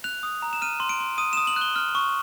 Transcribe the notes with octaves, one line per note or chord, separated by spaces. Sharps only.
F#6 F7
D#6
A#5
E7
F6 D#7
C6
D7
C6
D#6 D#7
D#6 E7
F#7
F#6
G7
F6
C#6